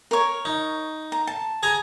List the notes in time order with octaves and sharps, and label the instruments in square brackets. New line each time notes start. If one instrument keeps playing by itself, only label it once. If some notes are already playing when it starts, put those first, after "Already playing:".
[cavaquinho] A#4 C#5
[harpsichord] D#4
[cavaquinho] A#5
A5
[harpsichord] G#4 G#5 A#5